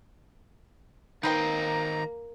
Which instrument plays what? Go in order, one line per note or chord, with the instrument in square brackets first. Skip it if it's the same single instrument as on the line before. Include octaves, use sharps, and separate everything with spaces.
[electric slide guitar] D#3 C5 D#5 [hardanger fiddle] A#3 [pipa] D#4 B4 G5 [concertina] A#5